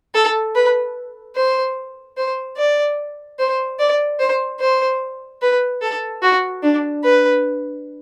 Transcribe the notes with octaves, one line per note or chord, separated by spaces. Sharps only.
A4
B4
C5
C5
D5
C5
D5
C5
C5
B4
A4
F#4
D4
B4